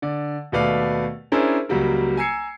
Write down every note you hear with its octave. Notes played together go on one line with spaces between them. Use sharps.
D3 D5
D#2 B2 A3 B4 D5 F5
C#4 D4 E4 G#4 A#4 C5
C#2 F#3 G3 A#3
G#5 A#5 E6 G#6 C7 C#7